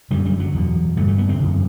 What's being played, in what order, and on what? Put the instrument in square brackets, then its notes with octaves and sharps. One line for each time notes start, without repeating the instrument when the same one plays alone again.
[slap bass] F#2 D3 G3
G3
F#3
E2 B2
G2 D3 A3
A3
B3
C4
F#2 D3